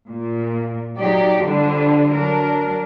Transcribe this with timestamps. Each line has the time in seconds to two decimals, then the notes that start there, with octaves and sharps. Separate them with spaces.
0.11 A#2
0.98 F#3 D#4 G4 D5
1.44 D3 F3 G3 D4
2.14 F#3 D4 A#4